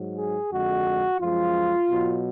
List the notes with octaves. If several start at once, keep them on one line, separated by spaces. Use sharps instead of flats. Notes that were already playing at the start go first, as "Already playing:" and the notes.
Already playing: G#2 F#3
G#4
F2 D3 G#3 F#4
F#2 F3 G#3 F4
B2 F#3